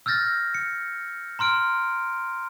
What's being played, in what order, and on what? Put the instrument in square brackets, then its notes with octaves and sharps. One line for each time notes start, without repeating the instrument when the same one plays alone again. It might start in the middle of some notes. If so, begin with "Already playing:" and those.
[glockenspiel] E6 F6 G6 A6 A#6
C#7
A#5 C6 F6 D7